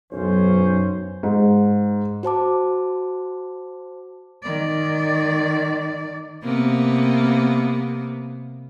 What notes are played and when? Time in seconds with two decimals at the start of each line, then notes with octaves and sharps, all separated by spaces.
0.12 B1 F#2 C#4 C5
1.23 G#2
2.23 F#4 C5 A5 D6
4.43 D#3 D5
6.44 C3 A#3 B3